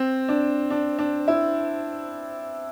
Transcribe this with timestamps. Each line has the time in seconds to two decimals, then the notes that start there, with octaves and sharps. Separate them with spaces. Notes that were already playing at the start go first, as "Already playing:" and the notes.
Already playing: C4
0.29 D4
0.70 D4
0.99 D4
1.28 E4